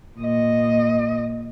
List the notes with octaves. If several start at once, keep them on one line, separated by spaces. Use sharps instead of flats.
A#2 D#5